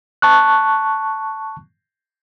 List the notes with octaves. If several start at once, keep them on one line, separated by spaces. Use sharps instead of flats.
A5 C#6 F#6